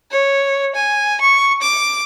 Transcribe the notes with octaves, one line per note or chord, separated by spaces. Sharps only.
C#5
G#5
C#6
D6